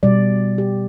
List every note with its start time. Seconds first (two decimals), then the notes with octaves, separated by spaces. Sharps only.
0.03 B2 G3 D5
0.58 G4